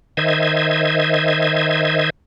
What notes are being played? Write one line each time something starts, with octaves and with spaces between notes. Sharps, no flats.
D#3 C5 D#5 E5 G#6